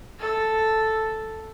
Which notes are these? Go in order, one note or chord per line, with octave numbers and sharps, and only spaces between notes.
A4